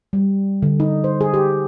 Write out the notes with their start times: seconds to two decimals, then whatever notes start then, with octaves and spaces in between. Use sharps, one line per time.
0.13 G3
0.62 D3
0.80 D#4
1.04 C5
1.21 G#4
1.34 G4